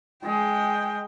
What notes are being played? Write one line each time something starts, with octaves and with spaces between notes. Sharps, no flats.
G#3 G5